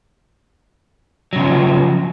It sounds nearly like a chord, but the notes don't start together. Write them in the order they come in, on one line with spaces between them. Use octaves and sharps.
F#3 C#3 F3